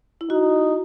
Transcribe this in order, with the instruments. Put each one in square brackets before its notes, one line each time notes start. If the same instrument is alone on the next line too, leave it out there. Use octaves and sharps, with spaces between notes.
[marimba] E4
[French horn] D#4 [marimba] F#4